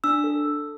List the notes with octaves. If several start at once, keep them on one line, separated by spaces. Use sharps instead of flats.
D4 E6
A4
A4